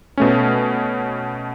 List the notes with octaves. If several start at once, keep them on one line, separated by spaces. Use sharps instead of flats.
B2 A3 C#4